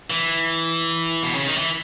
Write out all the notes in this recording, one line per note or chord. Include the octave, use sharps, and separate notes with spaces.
E3
B2
C#3
D#3
E3